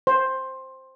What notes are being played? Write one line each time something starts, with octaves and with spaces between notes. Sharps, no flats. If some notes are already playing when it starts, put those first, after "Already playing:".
C5